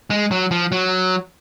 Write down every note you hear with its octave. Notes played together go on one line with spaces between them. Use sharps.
G#3
F#3
F3
F#3